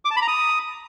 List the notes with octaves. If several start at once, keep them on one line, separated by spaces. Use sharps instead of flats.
D6
A5
B5
A#5
D#6